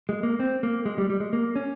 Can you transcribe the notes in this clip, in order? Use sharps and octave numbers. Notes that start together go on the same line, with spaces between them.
G#3
A#3
C4
A#3
G#3
G3
G3
G#3
A#3
C#4